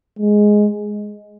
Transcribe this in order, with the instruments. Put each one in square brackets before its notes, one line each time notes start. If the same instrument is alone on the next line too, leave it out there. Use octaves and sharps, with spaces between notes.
[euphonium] G#3